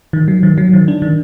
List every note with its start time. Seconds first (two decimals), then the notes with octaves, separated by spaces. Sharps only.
0.13 D#3
0.28 F#3
0.43 D#3
0.58 F#3
0.73 D#3
0.88 D4
1.02 D#3